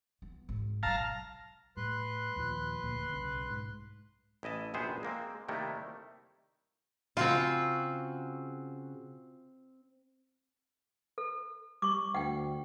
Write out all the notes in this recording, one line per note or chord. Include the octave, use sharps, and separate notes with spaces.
B3
G#1
B1 F#3 F5 A5 A#5
A2 G3 B4 C6 F#6
D#2 A#2 F3
D#1 D2 A#2
B1 C#3
G#2
A1 E4 D#5 A5
A#1 F#2 C3 B3 G#4 C5
G#3 A#3 C4
C3 D#3 G3 A3 A#3 E4
C#3 C4 F4 F#4
A4
G3 C#6 D6
D2 F#5 G5